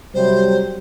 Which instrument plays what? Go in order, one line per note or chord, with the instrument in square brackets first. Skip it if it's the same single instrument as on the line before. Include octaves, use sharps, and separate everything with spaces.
[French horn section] C3 F#3 G3 [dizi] C5